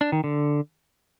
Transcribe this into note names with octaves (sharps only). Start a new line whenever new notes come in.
D4
D#3
D3